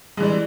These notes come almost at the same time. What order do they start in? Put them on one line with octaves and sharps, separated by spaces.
G#3 E3 G3